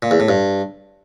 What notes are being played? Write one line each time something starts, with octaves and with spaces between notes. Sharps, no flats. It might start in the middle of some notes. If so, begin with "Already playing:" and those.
A#2
E2
A2
G2